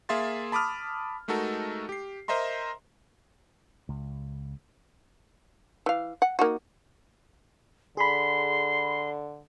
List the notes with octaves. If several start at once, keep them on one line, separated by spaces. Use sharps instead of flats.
A#3 G#4 E5 F5 C6 A6
A5 B5 D6 D#6 F6
G#3 A3 D#4 F#4 A4 A#4
G4 C7
A#4 C5 D#5 E5 A#5 C6
C#2
E3 F5
F#5
A#3 D#4 F#4
D3 G#4 B5 C6